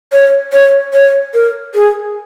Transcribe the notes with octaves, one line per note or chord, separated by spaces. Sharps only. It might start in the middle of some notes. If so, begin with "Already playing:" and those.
C#5
C#5
C#5
A#4
G#4